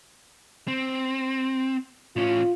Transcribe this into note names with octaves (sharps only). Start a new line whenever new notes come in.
C4
A2 C#4 F4